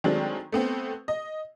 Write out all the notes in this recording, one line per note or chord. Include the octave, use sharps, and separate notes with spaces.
D#3 F#3 G#3 A3 C4 D4
A3 B3 C4
D#5